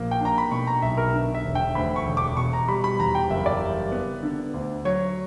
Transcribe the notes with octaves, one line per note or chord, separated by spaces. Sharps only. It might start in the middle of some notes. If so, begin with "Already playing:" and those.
Already playing: A#1 A#3
G5
D4 A#5
B5
B2 C#6
A#5
B1 E5
A#4
D3
E5
E1
G5
D2 B5
C#6
E1
D6
B2 C#6
A#5
G3 B5
B5
E2 A#5
G5
F#1 E5
D5
G3
B3
D3
D2
F#3 C#5